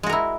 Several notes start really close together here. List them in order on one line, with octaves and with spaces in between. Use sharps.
G#3 F#4 A#4 E4